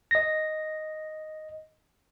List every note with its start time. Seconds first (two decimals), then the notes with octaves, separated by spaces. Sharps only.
0.11 D#5 A#6